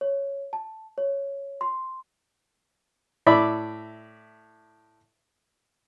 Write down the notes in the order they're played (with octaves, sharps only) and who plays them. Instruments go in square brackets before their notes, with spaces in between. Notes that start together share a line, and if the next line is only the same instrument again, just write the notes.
[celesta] C#5
A5
C#5
C6
[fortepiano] A2 D5 E5 B5 D6